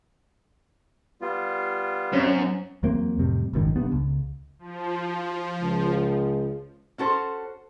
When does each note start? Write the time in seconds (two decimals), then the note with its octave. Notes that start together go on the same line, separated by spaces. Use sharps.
1.21 G3 B3 F4
2.13 F#2 C4 C#4
2.83 E2 F#3 A#3 C4
3.19 F2 A2 C3 G3
3.53 G#1 C#2 F#2 D#3
3.76 E1 G2 B3
3.92 C#2
4.59 F3
5.62 C#2
6.98 C#4 F#4 A4 C5